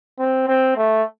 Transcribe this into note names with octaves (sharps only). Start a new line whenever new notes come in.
C4
C4
A3